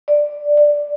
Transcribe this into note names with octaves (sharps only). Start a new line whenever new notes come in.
D5
D5